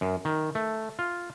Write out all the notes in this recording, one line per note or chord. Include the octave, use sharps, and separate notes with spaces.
F#2
D#3
A3
F4